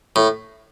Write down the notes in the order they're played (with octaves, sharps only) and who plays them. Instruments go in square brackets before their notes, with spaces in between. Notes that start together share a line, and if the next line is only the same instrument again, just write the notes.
[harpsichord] A2